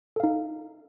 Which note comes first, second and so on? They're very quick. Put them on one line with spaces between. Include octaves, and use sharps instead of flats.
A4 F5 D#4